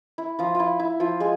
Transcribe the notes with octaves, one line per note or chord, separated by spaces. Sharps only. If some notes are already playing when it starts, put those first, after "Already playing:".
E4
F3 F4
E4 F4
E4
F3 F4
G#3 G#4